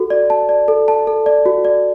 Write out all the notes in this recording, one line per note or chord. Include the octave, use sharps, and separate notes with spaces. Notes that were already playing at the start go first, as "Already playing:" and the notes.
Already playing: F#4 A4
D5
A5
D5
A4
A5
A4
D5
F#4
D5